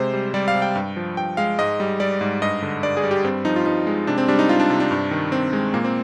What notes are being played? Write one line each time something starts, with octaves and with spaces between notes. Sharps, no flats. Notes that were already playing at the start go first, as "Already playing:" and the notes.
Already playing: C3 G#3 C5
G3
G3 D5
F5
C3
G5
G2
F3
G2 G5
G#3 F5
G#2 D#5
G3
G3 D5
G#2
G2 D#5
D3
G2 D5
G#4
G3
G4
G2 C4
F3 D#4
F4
G2 D#4
G#3
C3 D4
C4
G3 D4
D#4
G3 F4
D4
C3
D4
G2
D#3
G2 C4
G#3
A#2 A#3
C4